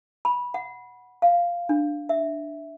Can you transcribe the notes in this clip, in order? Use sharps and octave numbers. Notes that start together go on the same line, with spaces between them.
B5
F#5
F5
D4
E5